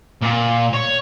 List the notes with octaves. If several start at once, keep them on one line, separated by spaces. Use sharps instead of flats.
A#2
C#5